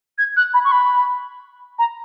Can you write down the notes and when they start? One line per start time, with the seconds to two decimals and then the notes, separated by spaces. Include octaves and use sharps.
0.18 G#6
0.37 F#6
0.54 B5
0.65 C#6
0.72 B5
1.79 A#5